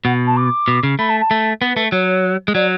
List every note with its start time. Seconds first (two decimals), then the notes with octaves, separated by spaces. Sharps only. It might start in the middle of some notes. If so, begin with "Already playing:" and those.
0.05 B2 F#5
0.27 A5
0.37 D6
0.68 B2
0.83 C#3
0.99 A3 B5
1.09 A5
1.20 A5
1.31 A3
1.61 B3 B4
1.77 A3
1.92 F#3 C#5
2.48 G#3
2.55 F#3 D5